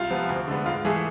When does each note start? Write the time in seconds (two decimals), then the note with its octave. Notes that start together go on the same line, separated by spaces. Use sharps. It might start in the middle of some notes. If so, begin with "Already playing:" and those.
Already playing: C2 F4
0.10 C3 F3 B3
0.29 D2
0.48 D3 G#3 B3
0.66 G#2 F4
0.85 E3 A3 G#4